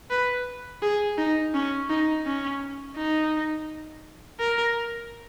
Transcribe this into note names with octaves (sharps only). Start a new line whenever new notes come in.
B4
G#4
D#4
C#4
D#4
C#4
D#4
A#4